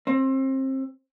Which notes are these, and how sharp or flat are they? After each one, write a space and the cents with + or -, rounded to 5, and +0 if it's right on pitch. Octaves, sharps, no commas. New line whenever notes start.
C4 +30